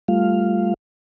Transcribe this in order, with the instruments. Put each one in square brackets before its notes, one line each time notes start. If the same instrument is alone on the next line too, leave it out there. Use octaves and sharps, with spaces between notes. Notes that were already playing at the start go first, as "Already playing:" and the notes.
[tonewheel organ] G3 A3 F4 F5